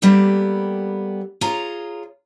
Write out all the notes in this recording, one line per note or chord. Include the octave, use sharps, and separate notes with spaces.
G3 A#3 B3 G4 A4
F4 G#4 C#5 A#5